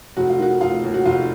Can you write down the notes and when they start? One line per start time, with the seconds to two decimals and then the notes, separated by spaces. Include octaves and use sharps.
0.17 F1 F#4
0.29 F4
0.39 D#3 F#4
0.61 F1 F4
0.83 D#2
0.94 F#4
1.05 F1 F4